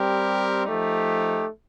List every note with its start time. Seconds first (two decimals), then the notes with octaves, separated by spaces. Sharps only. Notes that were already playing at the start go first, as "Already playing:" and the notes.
Already playing: G3 C4 G4 A#4
0.65 F3 A3 D#4 G4